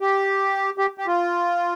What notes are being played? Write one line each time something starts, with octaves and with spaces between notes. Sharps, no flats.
G4
G4
G4
F4